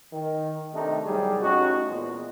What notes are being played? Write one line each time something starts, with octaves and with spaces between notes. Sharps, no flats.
D#3
C3 D#3 A3 D4 D#4
C2 G#2 F#3 G3 G#4
A2 C#4 D#4 F#4
E2 A#2 G#3